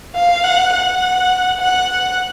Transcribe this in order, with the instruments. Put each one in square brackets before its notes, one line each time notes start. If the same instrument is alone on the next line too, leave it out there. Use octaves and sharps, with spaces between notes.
[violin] F5
F#5
F#5
F#5